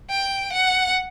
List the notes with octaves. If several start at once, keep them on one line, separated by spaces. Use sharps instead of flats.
G5
F#5